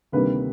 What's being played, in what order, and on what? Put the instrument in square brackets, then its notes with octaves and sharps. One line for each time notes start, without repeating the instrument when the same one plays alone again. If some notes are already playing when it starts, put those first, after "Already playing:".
[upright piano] D2 C3 D#3 G3 A#3 B4